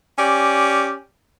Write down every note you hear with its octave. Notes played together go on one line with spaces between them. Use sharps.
C#4 G4 D5